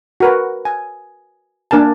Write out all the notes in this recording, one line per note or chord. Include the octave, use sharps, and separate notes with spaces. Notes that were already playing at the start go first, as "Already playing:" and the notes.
F#4 A#4 B4
G#5
A#3 D4 A#4 G#5 A5